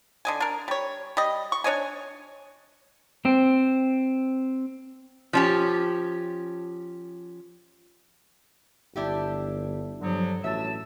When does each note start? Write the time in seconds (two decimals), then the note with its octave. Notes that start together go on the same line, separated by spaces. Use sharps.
0.25 D3 D#5 G#5
0.40 D4 A#4
0.68 G3 C#5
1.17 G3 D#5
1.52 C#6
1.64 D4 C#5 D#5 G#5
3.25 C4
5.33 F3 C#4 G4
8.96 G1 D4 E4 G4
10.01 G2 D3 F3 F#3
10.44 A1 F#3 E5 A5 E6